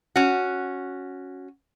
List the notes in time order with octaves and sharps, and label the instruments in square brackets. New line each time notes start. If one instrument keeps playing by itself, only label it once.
[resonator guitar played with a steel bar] C#4 F#4